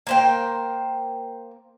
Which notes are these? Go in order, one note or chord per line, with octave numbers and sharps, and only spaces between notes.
A#3 C5 G5